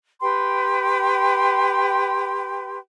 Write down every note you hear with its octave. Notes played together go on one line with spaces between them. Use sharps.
G4 B4 G5 C6